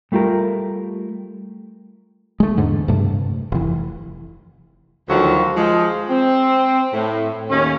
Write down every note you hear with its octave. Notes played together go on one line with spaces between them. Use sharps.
G3 A3 F4 G4 A#4
G#3 A3
E2 G#2 D3
G2 C3 G3 A3
F1 E3
D2 D#3 F3 F#3 F#4
F3 G#3
C4
A2
D#2 C#4